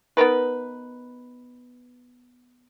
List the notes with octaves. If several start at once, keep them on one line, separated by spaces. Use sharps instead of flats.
B3 D#4 A#4 B4